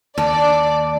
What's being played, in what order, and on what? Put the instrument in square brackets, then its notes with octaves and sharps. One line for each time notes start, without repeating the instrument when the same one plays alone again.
[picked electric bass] D#2 [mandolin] A4 F6 [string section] D5